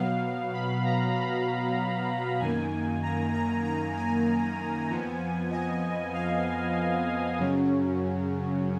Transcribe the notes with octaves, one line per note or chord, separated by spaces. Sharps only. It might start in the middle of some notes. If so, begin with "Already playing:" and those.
Already playing: B2 F#3 B3 F5
B5
A#5
B5
F#2 D#3 A#3 G#5
A#5
A#5
A#5
G#5
F2 F3 B3
D#5
F5
F#2 C#3 F#3 C#4